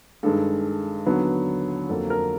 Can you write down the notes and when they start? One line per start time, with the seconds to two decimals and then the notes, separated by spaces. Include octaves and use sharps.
0.23 G2 D#3 G#3 A4
1.06 D#2 D3 F#3 B3
1.89 F2 D3 F#3 A#3 A4
2.10 A#4